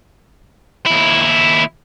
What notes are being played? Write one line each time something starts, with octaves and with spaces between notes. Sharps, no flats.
D#2 E4